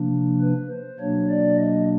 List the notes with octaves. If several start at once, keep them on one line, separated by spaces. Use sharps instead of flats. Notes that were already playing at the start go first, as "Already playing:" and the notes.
Already playing: C3 F3 A#3 D4
B4
C5
B2 F#3 A#3 D4 C#5
D5
D#5